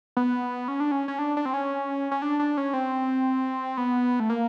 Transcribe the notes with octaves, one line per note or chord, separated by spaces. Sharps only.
B3
C#4
D4
C#4
C#4
D4
D4
C4
C#4
C#4
D4
D4
C#4
C4
B3
A3
A#3